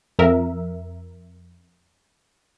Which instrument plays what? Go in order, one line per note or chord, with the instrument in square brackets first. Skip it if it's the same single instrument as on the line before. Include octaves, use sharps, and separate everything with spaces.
[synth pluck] F2 A#4 E5